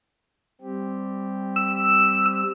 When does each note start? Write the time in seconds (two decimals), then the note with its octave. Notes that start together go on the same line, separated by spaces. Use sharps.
0.62 G3 C4 G4
1.56 E6